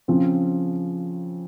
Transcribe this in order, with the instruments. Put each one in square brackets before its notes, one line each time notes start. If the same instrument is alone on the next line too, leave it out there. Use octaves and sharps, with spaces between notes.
[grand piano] C#3 F3 C4